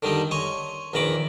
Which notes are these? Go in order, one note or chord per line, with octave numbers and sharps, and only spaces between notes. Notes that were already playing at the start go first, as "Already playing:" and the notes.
D3 D#3 G3 D#4
C#5 G#5 C6
A#1 E2 D#3 A#5 B5 D6